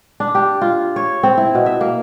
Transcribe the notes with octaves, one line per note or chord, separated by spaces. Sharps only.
D4
G4
F4
C#5
C4
E4
B2
E5
A#3